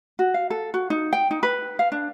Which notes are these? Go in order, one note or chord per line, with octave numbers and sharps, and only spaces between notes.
F#4
F5
A4
F#4
D#4
G5
D#4
B4
F5
D4